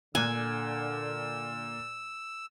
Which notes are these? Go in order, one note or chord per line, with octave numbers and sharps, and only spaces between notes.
A#2 D3 G#5 E6 F#6